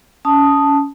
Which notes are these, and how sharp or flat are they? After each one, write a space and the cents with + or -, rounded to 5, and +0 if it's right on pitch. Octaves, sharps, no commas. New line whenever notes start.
C#4 +20 A5 +0 D#6 +0